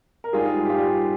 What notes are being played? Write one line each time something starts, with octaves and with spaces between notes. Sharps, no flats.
A#4
G#2 G3 F4 G#4
G4
G#2 G3 F4